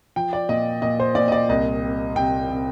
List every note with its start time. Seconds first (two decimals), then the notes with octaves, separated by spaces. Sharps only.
0.16 F3 G5
0.33 D5
0.49 A#2 D#5
0.82 A#2 D#5
1.00 C5
1.15 A#2 D5
1.28 D#5
1.32 D5
1.49 C2 D#5
1.83 C3
2.15 C3 G5
2.49 C3